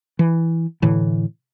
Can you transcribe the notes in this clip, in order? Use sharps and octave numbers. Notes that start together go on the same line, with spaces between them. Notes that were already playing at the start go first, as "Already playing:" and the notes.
E3
A2 D3 E3